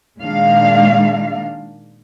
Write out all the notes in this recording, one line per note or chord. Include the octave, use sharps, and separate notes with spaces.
A#2 D#3 G#3 D4 F5